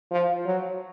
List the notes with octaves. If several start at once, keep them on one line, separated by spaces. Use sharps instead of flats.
F3
F#3